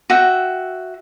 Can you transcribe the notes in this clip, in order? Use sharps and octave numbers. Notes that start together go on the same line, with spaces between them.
F#4 E5 G5